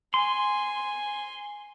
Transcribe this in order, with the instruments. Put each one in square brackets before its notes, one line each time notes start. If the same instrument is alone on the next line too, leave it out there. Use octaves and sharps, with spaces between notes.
[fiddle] G#5 [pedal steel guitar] C6